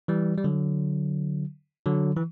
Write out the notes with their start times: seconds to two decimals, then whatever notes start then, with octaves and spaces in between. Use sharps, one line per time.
0.08 E3 G3
0.37 G3
0.44 D3 F#3
1.86 D3 F#3
2.17 E3